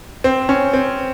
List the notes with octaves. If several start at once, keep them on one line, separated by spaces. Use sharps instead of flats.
C4
C#4
C4